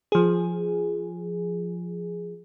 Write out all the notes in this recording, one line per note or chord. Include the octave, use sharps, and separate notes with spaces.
F3 G#4